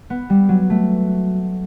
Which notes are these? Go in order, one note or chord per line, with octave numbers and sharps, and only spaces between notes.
B3
G3
F#3
A3